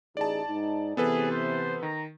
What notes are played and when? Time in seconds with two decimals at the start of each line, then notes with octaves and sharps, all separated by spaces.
0.17 A1 D#4 G#4 D5 A5
0.47 G#2 D#4
0.97 C3 E3 B3 G#4 A4 B4
1.31 C5
1.83 D#3 A#5